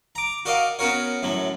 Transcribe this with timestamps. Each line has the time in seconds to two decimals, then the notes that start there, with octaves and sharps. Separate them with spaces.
0.15 A#5 D6
0.45 F#4 A#4 D5 D#5 F5
0.79 B3 C#4 F#4 A#4 C#5
1.23 F#2 A2 F#3